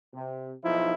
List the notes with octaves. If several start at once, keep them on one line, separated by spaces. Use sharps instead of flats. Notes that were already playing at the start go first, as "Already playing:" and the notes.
C3
B1 F3 D#4 E4